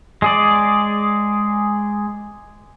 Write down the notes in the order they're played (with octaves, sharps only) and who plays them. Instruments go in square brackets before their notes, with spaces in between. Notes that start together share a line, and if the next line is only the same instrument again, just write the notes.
[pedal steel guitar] G#3 G#4 D5